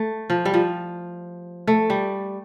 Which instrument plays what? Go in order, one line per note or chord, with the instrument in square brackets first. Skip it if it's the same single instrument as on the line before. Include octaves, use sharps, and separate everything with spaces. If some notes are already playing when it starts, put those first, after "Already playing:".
Already playing: [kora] A3
F3
G3
F3
A3
G3